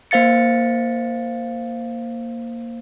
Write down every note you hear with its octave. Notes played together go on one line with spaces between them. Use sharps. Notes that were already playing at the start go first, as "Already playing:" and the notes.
A#3 C5 F5 A6 C#7